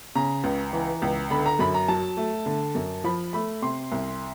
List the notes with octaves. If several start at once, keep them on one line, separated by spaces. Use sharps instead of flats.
C#3 A#5
C#2
E3
C#2
D3 B5
A#5
F#2 B5
A#5
F#3 A5
A3
D3
F#2
F3 B5
A3 B5
C3 C6
C2